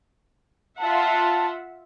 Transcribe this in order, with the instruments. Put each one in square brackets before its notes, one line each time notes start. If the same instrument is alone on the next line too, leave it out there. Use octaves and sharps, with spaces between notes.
[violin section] F4 E5 F#5 [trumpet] A5